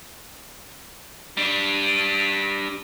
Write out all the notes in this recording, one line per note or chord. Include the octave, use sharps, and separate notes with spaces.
G3 D4